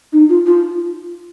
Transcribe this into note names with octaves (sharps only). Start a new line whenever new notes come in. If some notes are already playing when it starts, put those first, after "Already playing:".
D#4
F4
F4